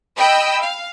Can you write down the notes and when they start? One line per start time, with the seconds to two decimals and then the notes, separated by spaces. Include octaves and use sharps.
0.17 D#5 G5 B5 E6
0.61 F5